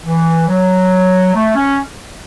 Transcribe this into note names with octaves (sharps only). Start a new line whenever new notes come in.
E3
F#3
A3
C#4